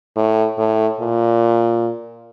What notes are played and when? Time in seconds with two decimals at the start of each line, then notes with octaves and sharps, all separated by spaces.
0.16 A2
0.58 A2
1.01 A#2